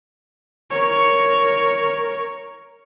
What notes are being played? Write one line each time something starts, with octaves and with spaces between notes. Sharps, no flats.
A#4 C#5